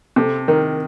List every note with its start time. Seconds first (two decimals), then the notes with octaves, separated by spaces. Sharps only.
0.16 C3 A4
0.48 D#3 A#4